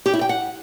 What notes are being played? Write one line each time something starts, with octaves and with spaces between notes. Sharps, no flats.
G4
E4
G5
F#5